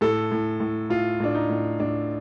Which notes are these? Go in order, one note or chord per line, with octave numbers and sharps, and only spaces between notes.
A2 A4
A2
A2
A2 F4
A2 D4
D#4
A2
A2 D4